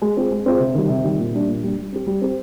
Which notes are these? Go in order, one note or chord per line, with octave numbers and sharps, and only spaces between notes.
G#3
C4 F4 G#4
G#3
C4 F4 G#4
C3
D#3 G3
C3
D#3 G3
A#2
G3 D4
A#2
G3 D4
G3
C4 G4
G3
C4 G4